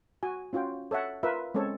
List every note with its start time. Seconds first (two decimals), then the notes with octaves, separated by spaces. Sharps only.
0.23 F#4 G#5
0.53 C#4 F4 F#4 C#5 G5
0.91 A4 C#5 E5 F#5
1.23 F4 A#4 B4 E5
1.54 G#3 C4 C#4 A4 C#5